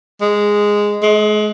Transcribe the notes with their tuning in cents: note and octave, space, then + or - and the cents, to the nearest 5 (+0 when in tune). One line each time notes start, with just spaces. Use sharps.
G#3 -5
G#3 +35